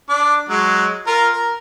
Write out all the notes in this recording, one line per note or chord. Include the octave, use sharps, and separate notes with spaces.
D4 D6
F#3 G#3
F4 A#4
A#4